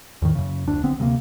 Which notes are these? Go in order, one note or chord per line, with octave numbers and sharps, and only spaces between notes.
E2 A2 D#3
F#2 C#3
F1 D2 D4
B1 D3 B3 C4
D2 C3 G3 A#3